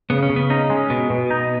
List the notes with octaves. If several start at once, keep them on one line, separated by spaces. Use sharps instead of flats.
C#3 B3
C#4
C#3
B3
C#4 D#4
G#3
B2 B3
B2
D#4